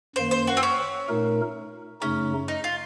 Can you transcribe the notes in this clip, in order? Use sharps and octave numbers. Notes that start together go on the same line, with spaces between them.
F#2 D#3 A#3 C5
C5
F#4
C4
C#4
A#2 A3 D#4 A#4
F#2 C#3 A3 C#4 D#4
D#4
F4